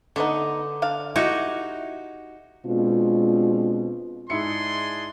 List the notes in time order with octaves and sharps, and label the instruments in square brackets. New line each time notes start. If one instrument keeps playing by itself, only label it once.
[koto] D3 [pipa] A3 B3 D#4
[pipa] D4 F5
[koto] D#4 F#4 G4 [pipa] E4
[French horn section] B2 G#3 C4 D4 F4
[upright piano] G#2 E4 C#7 [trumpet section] D4 G#4 C6